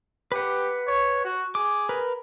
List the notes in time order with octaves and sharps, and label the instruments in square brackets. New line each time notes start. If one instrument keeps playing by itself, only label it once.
[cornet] G4 [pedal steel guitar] B4 F#5
[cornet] C#5
F#4
[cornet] G#4 [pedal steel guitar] D6
[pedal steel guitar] A#4 B4